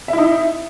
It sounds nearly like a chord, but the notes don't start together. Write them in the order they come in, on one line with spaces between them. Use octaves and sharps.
E5 E4 D#4